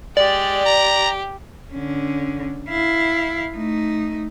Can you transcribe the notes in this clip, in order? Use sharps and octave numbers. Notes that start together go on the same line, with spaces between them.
G#3 G4 D5
A#5
D3 C#4
E4 F5
A3 D#4